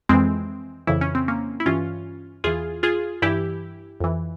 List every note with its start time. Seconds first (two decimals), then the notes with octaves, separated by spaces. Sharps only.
0.09 F2 E3 G#3 C4
0.87 F2 C#3 E3 E4
1.01 C#4
1.15 C4
1.28 A#3 C#4
1.60 E4
1.66 G2 E3 C#4 F4
2.44 E2 E3 F4 G#4
2.83 F4 G#4
3.22 G2 E3 E4 G4
4.00 F2 E3